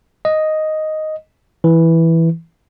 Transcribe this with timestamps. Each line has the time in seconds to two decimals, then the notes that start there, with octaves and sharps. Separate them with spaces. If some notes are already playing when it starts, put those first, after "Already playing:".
0.25 D#5
1.64 E3